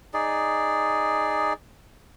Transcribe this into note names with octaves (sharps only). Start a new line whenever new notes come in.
D#4 G#4 D5